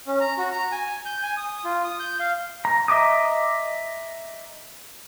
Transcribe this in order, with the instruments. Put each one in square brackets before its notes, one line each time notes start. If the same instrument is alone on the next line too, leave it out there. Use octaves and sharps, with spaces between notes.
[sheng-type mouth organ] C#4
A#5
F#4
A#5
G#5
G6
G#5
D#6
F4
D#6
G6
F5
[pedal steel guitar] A#5
D#5 E5 A#5 D6 D#6